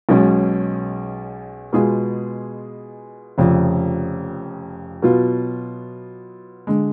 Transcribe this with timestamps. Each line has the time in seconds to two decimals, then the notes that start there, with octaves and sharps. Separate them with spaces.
0.09 B1 B2 G#3 C#4
1.73 B2 G#3 B3 F4 G#4
3.38 F1 F2 C#3
5.02 B2 F#3 B3 F4
6.67 D3 G#3